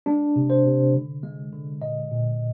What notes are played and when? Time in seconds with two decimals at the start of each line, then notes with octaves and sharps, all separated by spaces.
0.06 G#3 D4
0.36 C3
0.50 C5
0.65 C3
0.94 D3
1.23 G#3
1.53 D3
1.81 A#2 D#5
2.11 A#2